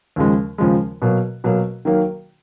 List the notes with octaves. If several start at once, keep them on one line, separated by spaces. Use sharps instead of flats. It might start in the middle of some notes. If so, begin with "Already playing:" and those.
D#2 C#3 F3 G#3
D#2 C#3 F3 G#3
B2 F#3 A#3
B2 F#3 A#3
D#3 F#3 A#3